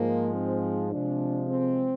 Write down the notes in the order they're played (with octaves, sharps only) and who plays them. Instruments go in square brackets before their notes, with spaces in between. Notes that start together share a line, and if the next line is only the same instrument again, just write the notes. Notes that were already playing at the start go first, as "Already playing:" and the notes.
Already playing: [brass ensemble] G#2 F3 G#3 A#3
C4
C3 F3 G#3 D4
C4